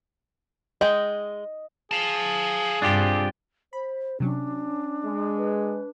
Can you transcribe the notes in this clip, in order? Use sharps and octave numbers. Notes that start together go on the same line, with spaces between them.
G#3 G#4 D#5 G5
G#4 F5 A5
G2 C3 D4 F4 G4
C5 B5
C3 F#3 C#4 D4
G#3
B4